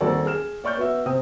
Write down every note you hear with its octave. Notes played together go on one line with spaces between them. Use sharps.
D#1 D#2 C4 F#4 A4 D5
G#4 F6 E7
C#5 D5 C#6 F6 G6
B3 F#4 E5
C3 C4 G5 D#6